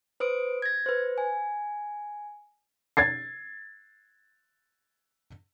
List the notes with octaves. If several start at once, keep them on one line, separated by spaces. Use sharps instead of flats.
B4 C5 D#6 D7
G#6 A#6
B4 C5
G#5
G#6 A6 C7